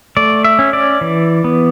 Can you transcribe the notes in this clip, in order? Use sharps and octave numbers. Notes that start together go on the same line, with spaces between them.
A3 D5
E5
C#4
D5
E3
B3